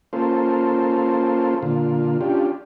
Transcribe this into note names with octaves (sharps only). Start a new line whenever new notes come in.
A#3 C#4 F4 A4 C5
A#2 D3 F4
C#4 D4 F4 G4